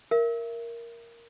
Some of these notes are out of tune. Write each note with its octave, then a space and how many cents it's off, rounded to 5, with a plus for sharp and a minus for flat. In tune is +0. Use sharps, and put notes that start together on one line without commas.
A#4 +0 E5 +25